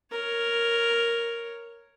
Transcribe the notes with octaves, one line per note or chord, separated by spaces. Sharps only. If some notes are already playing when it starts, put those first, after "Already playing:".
A#4 C#5